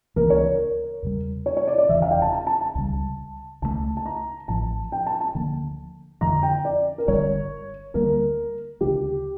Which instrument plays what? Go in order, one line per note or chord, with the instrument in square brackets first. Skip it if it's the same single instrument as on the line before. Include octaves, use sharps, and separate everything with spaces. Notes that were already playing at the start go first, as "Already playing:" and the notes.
[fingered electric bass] C#2 C#3 E3 A#3 [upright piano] A#4
[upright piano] C#5
A#4
[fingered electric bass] E2 C#3 G3
[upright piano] C#5
C#5
D5
D5
[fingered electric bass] F1 E2 C#3 E3 [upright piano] E5
[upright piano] F5
G5
A5
A5
A5
A5
[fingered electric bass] C#2 C#3 G3
[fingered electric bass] C#2 C#3 E3 A3 [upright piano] A5
[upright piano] A5
A#5
[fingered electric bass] A1 A2 F3 [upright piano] A5
[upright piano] G5
A5
A5
[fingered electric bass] D2 D3 F3 A#3
[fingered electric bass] F2 D3 F3 [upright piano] A#5
[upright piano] G5
D5
A#4
[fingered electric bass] G1 G2 D3 G3 [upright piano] C#5
[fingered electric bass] D2 D3 G3 A#3 [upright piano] A#4
[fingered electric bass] D2 C#3 G3 D4 [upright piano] G4